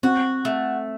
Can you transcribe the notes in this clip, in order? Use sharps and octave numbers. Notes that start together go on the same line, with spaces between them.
C4 F#4
A3